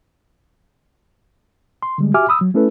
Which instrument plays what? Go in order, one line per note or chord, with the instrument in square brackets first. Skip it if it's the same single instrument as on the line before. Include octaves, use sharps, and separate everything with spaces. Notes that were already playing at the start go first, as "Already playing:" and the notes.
[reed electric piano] C6
D3 G3 G#3
F#4 G4 E5 G#5 D6 F6
B5 D#6 E6
F#3
A3 C#4 E4 A4 B4